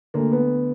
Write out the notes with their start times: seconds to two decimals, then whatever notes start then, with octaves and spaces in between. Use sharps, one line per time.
0.14 D2 D3 A#3
0.32 B3